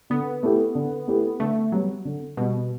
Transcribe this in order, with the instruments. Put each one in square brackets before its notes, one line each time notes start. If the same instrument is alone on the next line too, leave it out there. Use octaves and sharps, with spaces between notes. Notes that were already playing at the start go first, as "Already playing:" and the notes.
[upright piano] D3 [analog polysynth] B3
[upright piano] A3 E4 G4
D3
A3 E4 G4
[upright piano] D3 [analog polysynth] A3
[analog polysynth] F#3 [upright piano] G3 B3
[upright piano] D3
[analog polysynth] B2 [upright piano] G3 B3